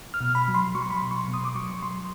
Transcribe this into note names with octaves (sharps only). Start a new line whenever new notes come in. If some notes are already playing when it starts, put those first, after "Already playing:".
F6
B2
B5
F#3
C6
F#3 C#6
C6
B5
C6
B2
C#6
C6
B2
D#6
D6
F#3 C#6
F#3 C6